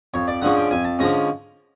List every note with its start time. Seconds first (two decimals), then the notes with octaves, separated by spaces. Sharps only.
0.14 F2 C#5
0.28 D5
0.41 D3 F3 G#3 C#4 F#5
0.57 G5
0.71 F2 G#5
0.84 A5
0.99 D3 F3 G#3 C#4 A#5